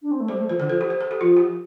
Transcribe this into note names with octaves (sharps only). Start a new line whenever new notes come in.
D4
C4
A3
G3 C5
A3
F3 C5
D3 A4
F3 C5
G4
C5
A4
G4
F3 F4
G4